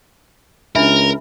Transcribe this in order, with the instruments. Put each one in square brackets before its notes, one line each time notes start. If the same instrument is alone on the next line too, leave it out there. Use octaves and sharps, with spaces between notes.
[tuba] C#2 [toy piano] D4 E5 B5 [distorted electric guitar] A#4